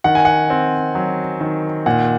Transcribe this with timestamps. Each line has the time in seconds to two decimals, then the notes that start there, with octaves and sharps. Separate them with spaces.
0.04 D#3 F#5
0.15 G#5
0.25 F#5
0.50 C4
0.95 F#3
1.41 D#3
1.86 A#2 F#5